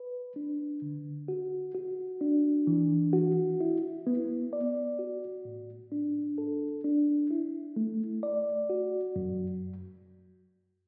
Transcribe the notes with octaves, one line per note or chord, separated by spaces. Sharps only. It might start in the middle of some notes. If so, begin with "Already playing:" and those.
Already playing: B4
D4
D3
F#4
F#4
D4
E3
F#4
E4
B3
D5
F#4
A2
D4
A4
D4
E4
A3
D5
F#4
F#2